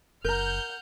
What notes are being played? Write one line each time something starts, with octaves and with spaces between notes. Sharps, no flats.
F#1 A#4 F#5 A#5 F6 G6